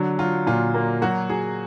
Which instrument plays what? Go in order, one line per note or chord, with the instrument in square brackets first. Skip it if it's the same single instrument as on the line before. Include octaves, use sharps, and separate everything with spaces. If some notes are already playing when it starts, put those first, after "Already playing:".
Already playing: [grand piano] D3 F#3
[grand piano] F#3 [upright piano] F4
[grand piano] A#2 [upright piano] F4
[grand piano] A#3
[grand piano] F#3 [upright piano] F#4
[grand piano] F#3 [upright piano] G#4